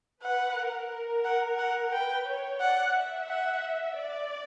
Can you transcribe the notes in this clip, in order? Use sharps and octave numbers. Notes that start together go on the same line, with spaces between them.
B4 F#5
A#4
A#4
F#5
F#5
B4 G5
C#5
D5 F#5
E5
F#5
D5